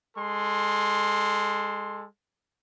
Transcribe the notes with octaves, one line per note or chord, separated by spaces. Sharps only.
G#3 A4 C6